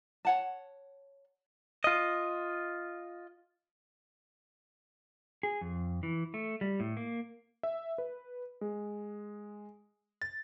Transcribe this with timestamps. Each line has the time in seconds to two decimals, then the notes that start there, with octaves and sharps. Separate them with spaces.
0.25 C#5 F#5 A5
1.84 F4 D#5
5.43 G#4
5.61 F2
6.03 E3
6.34 A3
6.61 G3
6.80 A2
6.97 A#3
7.63 E5
7.98 B4
8.61 G#3
10.22 A6